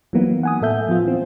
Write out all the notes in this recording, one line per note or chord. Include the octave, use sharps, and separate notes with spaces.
E3 F#3 A#3 B3 D#4
F#5 G#5 D#6
A2 A4 E5 G6
F3 B3 F4
E3 C4